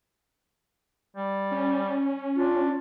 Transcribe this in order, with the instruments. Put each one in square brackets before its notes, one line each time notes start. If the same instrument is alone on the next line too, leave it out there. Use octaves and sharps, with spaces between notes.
[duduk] G3
[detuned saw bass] C#4
[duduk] D4 [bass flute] F4